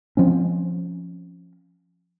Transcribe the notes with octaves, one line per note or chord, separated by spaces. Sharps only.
F3 C4 C#4